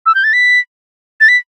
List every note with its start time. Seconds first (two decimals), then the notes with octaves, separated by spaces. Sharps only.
0.06 E6
0.15 G6
0.24 A6
0.33 B6
1.21 A6
1.28 B6